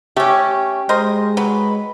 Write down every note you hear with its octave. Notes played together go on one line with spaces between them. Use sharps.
A3 C#4 G4
G#3 A#4 C5 D#5
F#3 B4